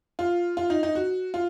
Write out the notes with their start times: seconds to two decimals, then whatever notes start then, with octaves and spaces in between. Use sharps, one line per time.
0.19 F4
0.57 F4
0.70 D#4
0.83 D#4
0.95 F#4
1.34 F4